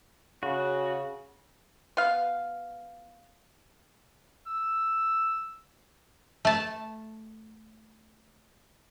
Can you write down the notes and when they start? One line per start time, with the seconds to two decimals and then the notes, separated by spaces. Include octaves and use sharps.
0.43 C#3 F#4
1.97 B3 F5
4.47 E6
6.45 A3 A5